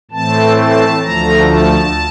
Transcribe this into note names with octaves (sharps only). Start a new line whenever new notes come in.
A2 E3 A3 C4 A5
A5
D2 D3 F3 A3 A#5
A5